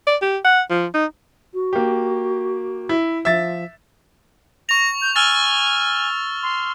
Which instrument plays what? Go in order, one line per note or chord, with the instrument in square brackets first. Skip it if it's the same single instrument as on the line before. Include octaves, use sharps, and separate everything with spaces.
[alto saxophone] D5
G4
F#5
F3
D#4
[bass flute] F#4
[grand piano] A#3 G4
E4
[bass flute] F3 [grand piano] E5 A6
[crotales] C#6 F7 [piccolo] A#6
[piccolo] G6
[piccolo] G#5 [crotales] E6 F6 A6
[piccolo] C6